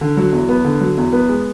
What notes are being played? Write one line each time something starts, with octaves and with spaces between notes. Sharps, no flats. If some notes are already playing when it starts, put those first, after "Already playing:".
D3
F#3
E2
B3
D3
F#3
E2
B3
G#3